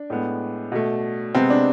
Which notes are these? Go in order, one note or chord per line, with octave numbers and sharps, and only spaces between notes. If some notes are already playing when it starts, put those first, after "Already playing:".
Already playing: D4
A2 G#3 B3
B2 A3
C3 G#3 B3 C4
D4